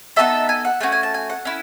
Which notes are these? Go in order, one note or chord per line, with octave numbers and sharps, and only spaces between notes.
B3 D#4 F#4 A4 E5
G#5
F#5
A3 C#4 F#4 G#5
G#5
A5
G#5
F#5
C#4 E4